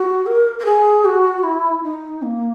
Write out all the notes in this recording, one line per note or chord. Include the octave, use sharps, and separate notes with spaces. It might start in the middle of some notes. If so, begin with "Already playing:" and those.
Already playing: F#4
A#4
A#4
G#4
F#4
E4
D#4
A#3